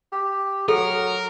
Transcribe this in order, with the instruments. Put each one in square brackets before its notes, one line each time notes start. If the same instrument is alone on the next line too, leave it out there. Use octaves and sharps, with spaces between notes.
[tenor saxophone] G4
[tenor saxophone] F#3 [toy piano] A4 [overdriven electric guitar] A#4